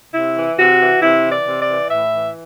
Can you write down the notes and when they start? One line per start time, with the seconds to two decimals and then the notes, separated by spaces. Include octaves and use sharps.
0.14 C3 E4
0.36 E3
0.58 C3 F#4
0.80 E3
1.02 C3 E4
1.24 E3
1.32 D5
1.46 C3
1.61 D5
1.69 E3
1.91 A2 E5
2.13 E3